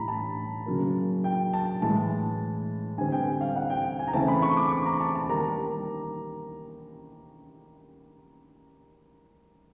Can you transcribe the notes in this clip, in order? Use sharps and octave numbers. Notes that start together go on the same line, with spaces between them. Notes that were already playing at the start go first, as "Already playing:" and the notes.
Already playing: A2 E3 G3 A#5 B5
A5
C#3 F#3 A#3
G5
A5
A2 E3 G#3 A5
D3 G3 C4 G#5
G5
G5
F5
F#5
G5
G5
G#5
A#5
C#3 E3 A3 C4 A5
B5
C#6
D6
D6
A#5
A5
A5
D#3 G3 A#3 A#5